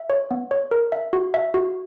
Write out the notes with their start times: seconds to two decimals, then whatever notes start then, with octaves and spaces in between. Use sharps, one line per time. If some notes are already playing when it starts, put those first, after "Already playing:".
Already playing: E5
0.10 C#5
0.31 B3
0.51 C#5
0.71 A#4
0.92 E5
1.13 F#4
1.34 E5
1.54 F#4